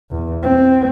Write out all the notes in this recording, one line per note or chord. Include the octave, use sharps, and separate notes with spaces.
E2
C4